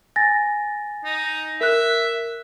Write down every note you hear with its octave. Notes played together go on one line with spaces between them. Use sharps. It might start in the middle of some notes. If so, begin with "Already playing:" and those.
G#5 A6 A#6
D#4
A#4 E5 F#6